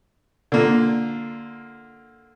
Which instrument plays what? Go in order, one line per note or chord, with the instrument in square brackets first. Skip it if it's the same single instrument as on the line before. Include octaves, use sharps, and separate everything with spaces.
[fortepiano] D3 A#3 F4